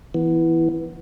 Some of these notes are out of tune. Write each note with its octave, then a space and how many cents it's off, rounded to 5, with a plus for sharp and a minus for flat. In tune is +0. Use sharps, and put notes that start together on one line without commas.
E3 +0 B3 +0